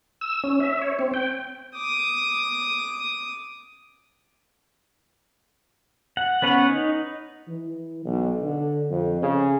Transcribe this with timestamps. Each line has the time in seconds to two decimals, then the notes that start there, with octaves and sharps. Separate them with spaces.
0.21 E6
0.44 C#4
0.60 E5
0.81 C#5
0.99 C4
1.14 G5
1.76 D6 D#6
6.17 F#5
6.42 B3 C#4 B4 C#5 F#5
6.69 D#4
7.48 E3
8.05 B1
8.42 D3
8.90 F2
9.22 C#3